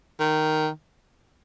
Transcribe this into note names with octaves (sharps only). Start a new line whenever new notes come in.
D#3